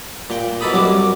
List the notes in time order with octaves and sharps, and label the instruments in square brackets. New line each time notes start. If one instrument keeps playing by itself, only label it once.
[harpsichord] A#2 G5
B2 E3 D#4 A4 B5 D#6
C2 F#2 F#3 G3 C#4 D6